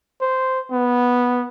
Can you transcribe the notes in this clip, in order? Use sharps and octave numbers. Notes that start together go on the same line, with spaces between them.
C5
B3